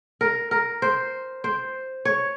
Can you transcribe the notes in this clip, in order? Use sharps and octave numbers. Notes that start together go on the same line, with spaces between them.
A#4
A#4
C5
C5
C#5